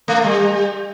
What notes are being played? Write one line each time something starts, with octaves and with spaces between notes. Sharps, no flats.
A3
G3